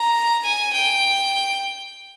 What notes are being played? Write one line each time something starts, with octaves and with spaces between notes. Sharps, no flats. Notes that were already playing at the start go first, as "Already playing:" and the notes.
Already playing: A#5
G#5
G5